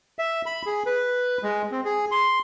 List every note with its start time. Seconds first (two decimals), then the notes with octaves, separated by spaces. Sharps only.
0.19 E5
0.46 B5
0.66 G#4
0.86 B4
1.43 G#3
1.72 C4
1.85 G#4
2.11 C6